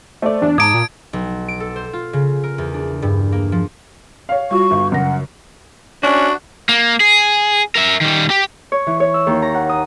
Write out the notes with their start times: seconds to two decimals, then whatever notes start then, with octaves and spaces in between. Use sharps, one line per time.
0.22 A3 C5 D5
0.42 E2 D4
0.58 G#2 A5 A#5 D6 D#6 G#6 D7
0.74 A#2
1.13 B1
1.48 D7
1.60 A4
1.76 C5
1.93 F4
2.13 C#3
2.44 A#4
2.58 E2
2.74 D4
3.02 G2
3.32 A#3
3.52 F3
4.29 C#5 F5
4.51 G3 F4 F#4 C#6
4.71 G1
4.92 F#2 C#3 F#5 A#6
6.03 C#4 D4 F#4
6.69 A#3
7.00 G#4
7.76 A#4 E5
8.01 D#3 G3
8.30 G4
8.72 C#5
8.87 E3
9.00 C#5
9.14 E6
9.27 D#2
9.42 A#5
9.54 F#5
9.69 D#6